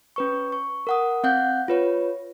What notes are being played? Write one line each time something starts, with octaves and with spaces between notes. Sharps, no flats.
C#4 B4 C#6
C#6
A#4 F#5 D#6
C4 F5 F#5 F#6 G6
F4 B4 C#5